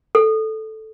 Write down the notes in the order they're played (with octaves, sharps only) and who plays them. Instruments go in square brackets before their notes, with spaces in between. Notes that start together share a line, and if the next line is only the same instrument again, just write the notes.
[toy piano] A4